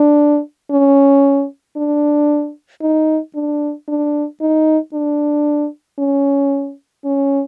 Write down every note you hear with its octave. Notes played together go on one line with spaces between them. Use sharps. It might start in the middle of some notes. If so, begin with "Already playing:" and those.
Already playing: D4
C#4
D4
D#4
D4
D4
D#4
D4
C#4
C#4